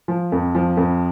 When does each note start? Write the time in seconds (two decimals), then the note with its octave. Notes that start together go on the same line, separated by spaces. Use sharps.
0.08 F3
0.32 F2
0.55 F3
0.77 F2